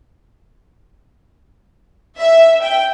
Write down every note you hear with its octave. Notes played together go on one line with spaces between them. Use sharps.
E5
G5